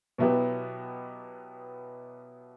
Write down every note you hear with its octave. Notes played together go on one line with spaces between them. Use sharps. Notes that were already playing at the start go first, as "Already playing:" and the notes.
B2 F#3 B3 E4 G4